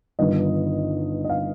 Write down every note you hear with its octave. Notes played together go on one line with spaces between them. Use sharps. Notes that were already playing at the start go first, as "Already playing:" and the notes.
G1 G2 D#3 D#5
D#5
F5